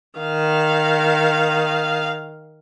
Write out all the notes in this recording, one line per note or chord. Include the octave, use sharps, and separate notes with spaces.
D#3 F5